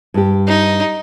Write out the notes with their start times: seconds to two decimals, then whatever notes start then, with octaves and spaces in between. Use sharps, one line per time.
0.14 G2 G4
0.48 D#4